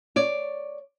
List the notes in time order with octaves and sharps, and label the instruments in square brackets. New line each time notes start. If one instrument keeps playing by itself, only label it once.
[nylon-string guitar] C#5 D5